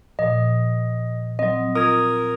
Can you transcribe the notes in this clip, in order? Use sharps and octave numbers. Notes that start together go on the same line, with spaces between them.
A#2 F3 D#5
F#3 C4 D#5
F4 A#4 D#6 G#6